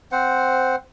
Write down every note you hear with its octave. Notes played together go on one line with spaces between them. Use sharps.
C4 C5 F#5